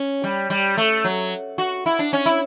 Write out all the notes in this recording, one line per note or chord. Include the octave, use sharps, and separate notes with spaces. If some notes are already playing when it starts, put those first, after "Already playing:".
Already playing: C#4
G3
G3
A3
F#3
F#4
E4
D4
C#4
E4